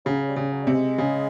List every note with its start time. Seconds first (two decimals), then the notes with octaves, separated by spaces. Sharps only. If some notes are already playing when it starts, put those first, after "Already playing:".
0.05 C#3 F#3
0.28 G3
0.36 C#3
0.52 F#3
0.64 C3 G3
0.74 G#3
0.98 C#3